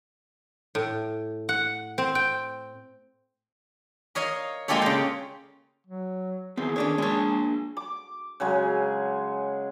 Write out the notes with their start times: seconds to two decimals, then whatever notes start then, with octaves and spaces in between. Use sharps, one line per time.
0.75 A2
1.49 F#5
1.98 C4
2.15 G5
4.15 A#4 C#5 D#5 F5
4.68 G#3 A#3 F4 G4 A4 C#5
4.82 C#3 G5
5.87 F#3
6.57 D#3 E3 B3 C4 G#4
6.76 D#3 A3 C#4 D4 C#5
6.98 G#3 A#3 D4 C#5 A5
7.77 D6
8.40 C#3 F#3 G#3 G#5